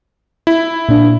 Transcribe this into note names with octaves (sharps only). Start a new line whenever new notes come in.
E4
A#2 D4